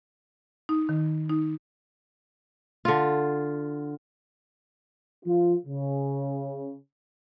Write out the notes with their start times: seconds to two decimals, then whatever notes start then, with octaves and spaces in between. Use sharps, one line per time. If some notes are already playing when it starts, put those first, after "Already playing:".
0.69 D#4
0.89 D#3
1.29 D#4
2.85 D3 F4
5.25 F3 F4
5.66 C#3